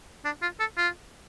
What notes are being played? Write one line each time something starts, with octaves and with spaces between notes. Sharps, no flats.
D4
F4
A4
F4